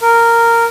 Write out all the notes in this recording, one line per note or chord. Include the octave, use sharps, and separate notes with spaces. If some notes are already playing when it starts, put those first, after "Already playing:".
A#4